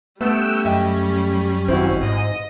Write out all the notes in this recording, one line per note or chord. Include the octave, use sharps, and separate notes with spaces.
G3 A3 B3 C#4 F#5 G5 E6
F#2 D#5 E5 G5
G#1 C4 E4 F#4
G#2 D#5